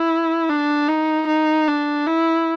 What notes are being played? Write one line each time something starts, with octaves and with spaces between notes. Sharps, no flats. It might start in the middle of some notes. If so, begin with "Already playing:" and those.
Already playing: E4
D4
D#4
D#4
D4
E4